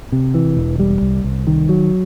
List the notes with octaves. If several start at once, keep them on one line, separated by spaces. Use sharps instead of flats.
C3
E3
E1
G3
C2
C2
D#3
F#3